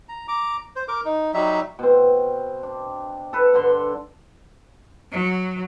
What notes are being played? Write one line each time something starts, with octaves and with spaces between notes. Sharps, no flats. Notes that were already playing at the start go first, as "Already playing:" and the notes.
A#5
A#5 D6
C5
A#4 D6
D#4
F#3 G3 D#4 E5
B2 C4
D4
A4 B4
G2 D3 C6
F#3